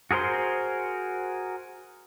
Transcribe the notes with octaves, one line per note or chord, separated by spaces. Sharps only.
F#4 G#4 A#4 C5 C6